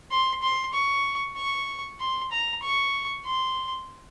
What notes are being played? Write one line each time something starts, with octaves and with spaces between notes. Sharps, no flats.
C6
C6
C#6
C#6
C6
A#5
C#6
C6